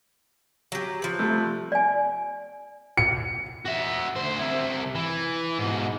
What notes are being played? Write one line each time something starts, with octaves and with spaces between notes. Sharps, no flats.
F#3 G4
F3 B4
C3 G3 A3
D5 G#5
C#7
F#4 E5
D2 C5
C3 E4
E3
G#2 B2